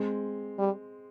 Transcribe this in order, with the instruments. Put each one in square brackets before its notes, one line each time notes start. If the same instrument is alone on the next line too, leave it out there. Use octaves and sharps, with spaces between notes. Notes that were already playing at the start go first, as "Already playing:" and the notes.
Already playing: [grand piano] G#3 C4
[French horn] G3